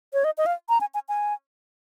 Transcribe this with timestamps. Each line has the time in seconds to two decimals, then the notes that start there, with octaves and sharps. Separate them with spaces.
0.13 C#5
0.24 D#5
0.38 D#5
0.46 F5
0.69 A#5
0.81 G#5
0.94 G#5
1.09 G#5